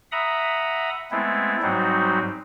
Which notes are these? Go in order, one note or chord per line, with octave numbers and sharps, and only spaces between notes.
E5 F#5 A#5 B5 D#6
G#3 A3 B3 C4 E4
G#2 F#3 G3 C4 D#4 F#4